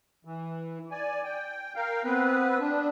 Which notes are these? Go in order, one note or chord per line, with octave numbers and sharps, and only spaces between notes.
E3
D5 G#5
G5
A#4 F5 G5
B3 C4 B4
D4